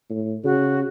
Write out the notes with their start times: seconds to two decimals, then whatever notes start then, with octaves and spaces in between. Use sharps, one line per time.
0.10 A2
0.44 C#3 F#4